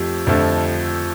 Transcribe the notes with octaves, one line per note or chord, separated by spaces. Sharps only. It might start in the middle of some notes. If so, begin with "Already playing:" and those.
Already playing: F2 F3 A3 G4
F2 D3 F3 A3